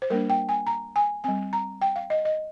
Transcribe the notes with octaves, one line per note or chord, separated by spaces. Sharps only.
C5
G3 A#3 D4 A#4
G5
G#5
A#5
G#5
G3 C4 G#5
A#5
G5
F5
D#5
D#5